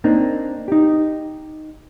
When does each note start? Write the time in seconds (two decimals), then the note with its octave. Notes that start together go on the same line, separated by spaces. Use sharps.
0.04 A#3 C4 D4 D#4
0.68 D#4 G4